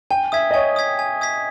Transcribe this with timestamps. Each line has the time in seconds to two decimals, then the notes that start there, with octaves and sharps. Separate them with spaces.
0.11 G5 G#5
0.32 E5 D#6 G#6 B6
0.51 D#5
0.54 C#5 G#5
0.76 D#6 G#6 B6
0.99 G#5
1.21 D#6 G#6 B6